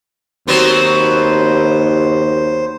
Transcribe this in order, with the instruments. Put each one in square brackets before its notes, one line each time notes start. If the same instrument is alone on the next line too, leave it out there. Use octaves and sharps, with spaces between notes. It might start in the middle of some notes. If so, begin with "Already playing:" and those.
[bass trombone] D#2 [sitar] F#3 B3 C4 [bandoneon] C5